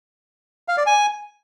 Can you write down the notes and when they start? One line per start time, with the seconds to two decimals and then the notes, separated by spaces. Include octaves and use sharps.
0.68 F5
0.77 D5
0.86 G#5